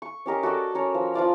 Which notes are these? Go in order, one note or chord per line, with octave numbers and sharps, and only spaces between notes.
C#6
C#4 G4 A#4 D#5
F#4 A4 D5
C#4 A#4 C#5
F3
F3 F4 D5 F#5